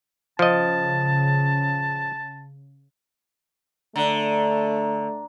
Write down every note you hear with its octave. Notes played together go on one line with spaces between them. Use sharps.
C#3 F3 D#5 A5
D3 A3 A#5